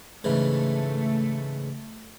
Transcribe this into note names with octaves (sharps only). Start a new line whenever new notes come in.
G#2 C#3 E3 A3